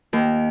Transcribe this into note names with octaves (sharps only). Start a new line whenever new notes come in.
D#2